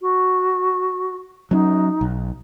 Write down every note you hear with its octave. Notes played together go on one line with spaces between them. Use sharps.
F#4
F#3 C4 C#4 D#4
B1